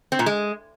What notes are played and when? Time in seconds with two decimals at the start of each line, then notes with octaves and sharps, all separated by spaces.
0.12 C4
0.19 A#2
0.26 G#3